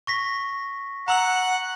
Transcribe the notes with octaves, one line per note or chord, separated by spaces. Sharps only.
C#6 A#6 B6
F#5 A#5 E6 F#7